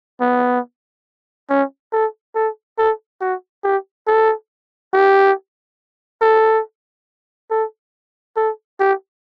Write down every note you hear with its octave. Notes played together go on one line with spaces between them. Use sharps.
B3
C#4
A4
A4
A4
F#4
G4
A4
G4
A4
A4
A4
G4